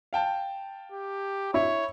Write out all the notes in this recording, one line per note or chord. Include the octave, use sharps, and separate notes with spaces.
F5 G5 A5
G4
E4 C#5